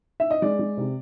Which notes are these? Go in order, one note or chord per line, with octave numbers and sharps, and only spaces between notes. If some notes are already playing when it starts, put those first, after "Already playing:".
E5
D#5
G#3 D5
G#3
C3